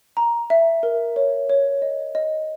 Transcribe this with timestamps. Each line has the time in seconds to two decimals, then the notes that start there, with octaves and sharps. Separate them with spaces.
0.17 A#5
0.50 E5
0.83 A#4
1.16 C#5
1.50 C#5
1.82 D#5
2.15 D#5